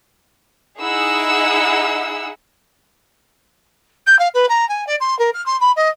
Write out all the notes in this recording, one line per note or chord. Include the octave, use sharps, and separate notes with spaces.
D#4 E4 G#4 D#5 F#5 E6
G6
F5
B4
A#5
G#5
D5
C6
A#4
F6
C6
B5
D#5